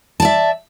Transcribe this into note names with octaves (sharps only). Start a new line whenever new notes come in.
D5 E5 A5